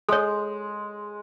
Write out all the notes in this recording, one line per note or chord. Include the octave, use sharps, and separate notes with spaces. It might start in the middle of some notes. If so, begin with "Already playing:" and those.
G#3 A4 C#5